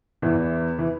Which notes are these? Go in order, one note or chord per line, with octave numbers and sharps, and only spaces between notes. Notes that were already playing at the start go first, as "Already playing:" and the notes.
E2 E3
E3